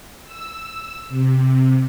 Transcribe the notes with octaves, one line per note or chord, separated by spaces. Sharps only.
E6
C3